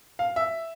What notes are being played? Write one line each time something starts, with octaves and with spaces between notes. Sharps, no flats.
F5
E5